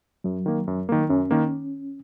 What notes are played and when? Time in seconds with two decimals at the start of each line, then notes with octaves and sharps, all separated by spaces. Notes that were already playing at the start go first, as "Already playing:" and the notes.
0.24 F#2 F#3
0.46 D#3 A#3
0.68 F#2
0.89 D#3 A#3
1.09 F#2 C#4
1.31 D#3 A#3